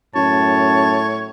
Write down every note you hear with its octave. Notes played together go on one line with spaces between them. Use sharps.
F#2 A2 C#5 A5